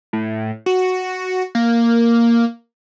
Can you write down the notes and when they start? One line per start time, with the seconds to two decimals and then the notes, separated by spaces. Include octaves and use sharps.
0.13 A2
0.66 F#4
1.55 A#3